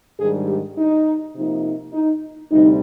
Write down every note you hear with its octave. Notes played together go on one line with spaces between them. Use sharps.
G#2 D#3 G3 D4 G#4
G4
D#4
C3 F3 A#3 D#4
D#4
D2 C3 G3 D#4